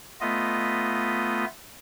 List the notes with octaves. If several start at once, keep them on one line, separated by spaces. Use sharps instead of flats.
A3 B3 F4 D#5